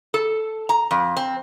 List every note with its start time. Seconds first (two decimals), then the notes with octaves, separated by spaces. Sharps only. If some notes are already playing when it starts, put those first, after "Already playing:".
0.14 A4
0.69 A#5
0.91 F2
1.17 C4